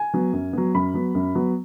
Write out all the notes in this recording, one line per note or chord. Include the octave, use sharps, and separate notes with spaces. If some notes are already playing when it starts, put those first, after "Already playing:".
Already playing: G#5
F#3 B3
F#2
F#3 B3
F#2 B5
F#3 B3
F#2
F#3 B3